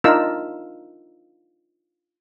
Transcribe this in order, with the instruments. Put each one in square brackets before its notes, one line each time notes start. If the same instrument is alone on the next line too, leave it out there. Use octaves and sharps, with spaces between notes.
[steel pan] D4 D#4 F4 A#4 E6